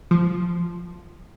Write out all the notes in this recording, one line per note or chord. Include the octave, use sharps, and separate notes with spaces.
F3